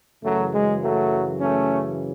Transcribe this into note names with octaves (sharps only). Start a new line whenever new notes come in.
F#2 C#3 E3 F#3 A3
G#3
F#3 A3
A3 C#4